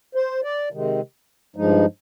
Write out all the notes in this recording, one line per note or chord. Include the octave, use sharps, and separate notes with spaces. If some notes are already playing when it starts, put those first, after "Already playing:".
C5
D5
C3 D#3 G#3
G2 F3 G#3 D#4